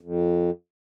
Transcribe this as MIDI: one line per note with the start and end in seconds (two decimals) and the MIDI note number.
0.01 0.50 41